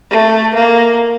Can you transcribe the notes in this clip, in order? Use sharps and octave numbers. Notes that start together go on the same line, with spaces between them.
A3
A#3